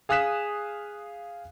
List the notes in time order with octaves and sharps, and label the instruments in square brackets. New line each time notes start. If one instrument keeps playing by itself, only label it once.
[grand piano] G#4 F5 D#6 F#6 B6 E7